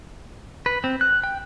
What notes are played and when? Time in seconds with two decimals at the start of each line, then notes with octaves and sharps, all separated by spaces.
0.66 B4
0.84 C4
1.01 F#6
1.24 G5